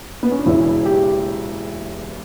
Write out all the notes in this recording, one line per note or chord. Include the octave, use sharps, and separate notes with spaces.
B3
C#4
D4
E1 E2 C#3 E3 E4
G4